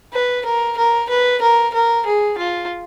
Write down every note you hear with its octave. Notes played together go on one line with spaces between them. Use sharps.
B4
A#4
A#4
B4
A#4
A#4
G#4
F4